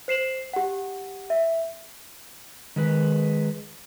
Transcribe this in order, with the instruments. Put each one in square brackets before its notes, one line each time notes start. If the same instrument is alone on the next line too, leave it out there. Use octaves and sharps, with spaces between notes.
[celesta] C5 C7 E7 F#7
G4 F#5
E5
[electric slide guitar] D#3 G#3 B4